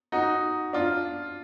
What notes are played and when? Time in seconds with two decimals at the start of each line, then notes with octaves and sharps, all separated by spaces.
0.12 D#4 F#4
0.73 D4 F4